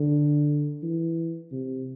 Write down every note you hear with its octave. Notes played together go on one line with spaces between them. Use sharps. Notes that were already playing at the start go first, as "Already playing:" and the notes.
Already playing: D3
E3
C3